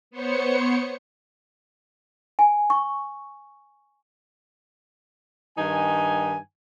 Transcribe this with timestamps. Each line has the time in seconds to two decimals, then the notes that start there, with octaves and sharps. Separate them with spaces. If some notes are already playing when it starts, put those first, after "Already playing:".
0.11 B3 C5 C#5 C#7
2.39 G#5
2.70 C#6
5.58 G2 D#3 D#4 G#5